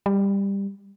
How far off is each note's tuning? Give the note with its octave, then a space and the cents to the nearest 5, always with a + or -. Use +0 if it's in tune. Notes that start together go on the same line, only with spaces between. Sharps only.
G3 +15